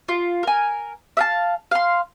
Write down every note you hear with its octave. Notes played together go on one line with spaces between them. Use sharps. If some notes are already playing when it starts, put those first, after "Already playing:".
F4
A#4 G#5
E5 F5 A5
F5 C6